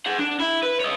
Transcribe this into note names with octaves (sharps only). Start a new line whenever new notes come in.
G#4 F#5
D4
E4
B4
C#5 D#5